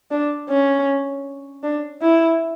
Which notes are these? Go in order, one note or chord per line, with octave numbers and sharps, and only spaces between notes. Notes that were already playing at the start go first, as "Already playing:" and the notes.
D4
C#4
D4
E4